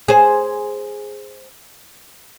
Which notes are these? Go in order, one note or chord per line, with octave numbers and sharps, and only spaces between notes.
G#4 C5